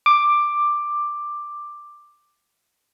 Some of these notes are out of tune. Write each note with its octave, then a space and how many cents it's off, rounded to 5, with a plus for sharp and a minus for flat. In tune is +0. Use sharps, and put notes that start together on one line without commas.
D6 +10